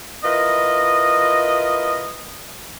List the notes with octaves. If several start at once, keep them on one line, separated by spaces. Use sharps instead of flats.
E4 F4 A#4 B4 D#5